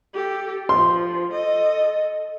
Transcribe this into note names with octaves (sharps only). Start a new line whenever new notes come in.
G4 A4
F3 C6
A4 D#5